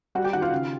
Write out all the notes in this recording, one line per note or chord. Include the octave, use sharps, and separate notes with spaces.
G3 F#4 F#5
G4 G5
D#3 F#4 F#5
F4 F5
C#3